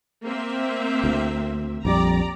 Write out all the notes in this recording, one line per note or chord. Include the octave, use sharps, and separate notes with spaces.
A#3 C4 E5
D2
A#1 F2 G3 D5 A#5